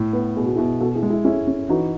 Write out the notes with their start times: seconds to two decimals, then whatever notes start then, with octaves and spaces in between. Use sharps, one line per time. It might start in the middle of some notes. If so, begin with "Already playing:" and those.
Already playing: A2 E4
0.13 B3
0.37 B2 G#4
0.46 F#4
0.56 E4 G#4
0.58 B2
0.80 B2 F#4 A4
0.95 E4 G#4
1.03 G#3
1.10 E4 G#4
1.25 C#4 E4 G#4
1.47 C#4
1.69 E3 D#4 F#4